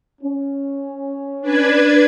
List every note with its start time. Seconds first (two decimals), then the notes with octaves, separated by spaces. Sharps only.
0.21 C#4
1.41 D4 B4 G#6